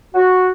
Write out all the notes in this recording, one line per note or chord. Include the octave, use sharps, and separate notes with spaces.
F#4